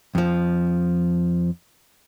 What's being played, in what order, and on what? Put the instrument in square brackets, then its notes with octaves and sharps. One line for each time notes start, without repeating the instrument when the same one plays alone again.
[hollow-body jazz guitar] F2 F3